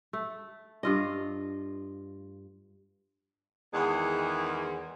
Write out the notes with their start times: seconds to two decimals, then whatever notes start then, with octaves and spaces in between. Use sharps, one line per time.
0.13 A3
0.83 G2 F4 D#5
3.73 E2 D#3 G#3 G#4